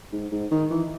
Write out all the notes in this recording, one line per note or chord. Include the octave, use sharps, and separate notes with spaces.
G#2
G#2
D#3
E3